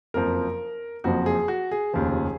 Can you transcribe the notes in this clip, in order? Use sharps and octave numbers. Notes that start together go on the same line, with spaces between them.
F#1 F2 F3 A#4
F#1 F2 F3 F#4
G#4
F#4
G#4
F1 D#2 C#3 F3